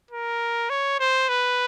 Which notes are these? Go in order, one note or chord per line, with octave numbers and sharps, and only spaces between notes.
A#4
C#5
C5
B4